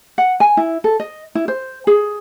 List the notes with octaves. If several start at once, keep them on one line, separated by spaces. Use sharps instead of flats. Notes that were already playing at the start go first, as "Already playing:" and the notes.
F#5
G#5
E4
A4
D#5
E4
C5
G#4